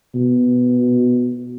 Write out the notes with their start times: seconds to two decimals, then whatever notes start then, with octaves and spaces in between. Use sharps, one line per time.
0.15 B2